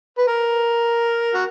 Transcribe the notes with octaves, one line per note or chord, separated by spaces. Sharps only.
B4
A#4
F#4